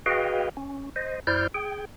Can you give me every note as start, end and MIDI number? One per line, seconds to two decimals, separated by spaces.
0.06 0.49 66
0.06 0.49 68
0.06 0.49 71
0.06 0.49 75
0.06 0.49 77
0.06 0.49 79
0.57 0.90 61
0.96 1.20 72
0.96 1.20 75
1.27 1.47 42
1.27 1.47 64
1.27 1.47 72
1.27 1.47 74
1.27 1.47 89
1.27 1.47 91
1.54 1.85 68
1.54 1.85 79